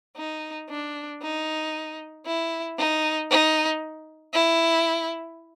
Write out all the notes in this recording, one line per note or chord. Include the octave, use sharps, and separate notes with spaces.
D#4
D4
D#4
E4
D#4
D#4
E4